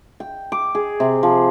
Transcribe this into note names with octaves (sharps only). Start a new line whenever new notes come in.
G5
D6
G#4
C3
F3